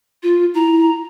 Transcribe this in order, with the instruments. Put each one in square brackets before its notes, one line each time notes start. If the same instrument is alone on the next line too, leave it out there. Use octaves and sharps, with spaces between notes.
[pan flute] F4
[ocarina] E4 [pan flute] A#5